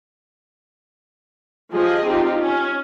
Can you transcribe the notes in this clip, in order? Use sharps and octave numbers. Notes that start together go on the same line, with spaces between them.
F3 G4 G#4 D#5
C4 D#4 F4 G4
C#4